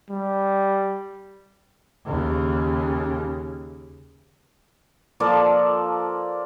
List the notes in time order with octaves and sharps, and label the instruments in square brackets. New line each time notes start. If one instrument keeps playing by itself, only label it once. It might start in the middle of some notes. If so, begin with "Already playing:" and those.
[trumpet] G3
[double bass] D#2 C#3
[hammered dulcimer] F3 A#3 A4 D5